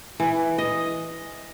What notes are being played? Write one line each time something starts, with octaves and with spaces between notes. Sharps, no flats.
E3
D#5